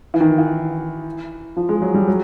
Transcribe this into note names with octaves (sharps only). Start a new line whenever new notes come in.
E3
D#3
E3
F3
G#3
F#3
G3
F#3